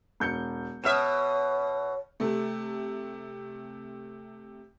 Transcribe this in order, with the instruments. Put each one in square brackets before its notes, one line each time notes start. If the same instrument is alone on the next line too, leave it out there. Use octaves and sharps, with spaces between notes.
[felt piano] E1 G6 C#7
[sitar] B2 E5 [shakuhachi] C#5 [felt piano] D#6 F6 E7
[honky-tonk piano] C3 A3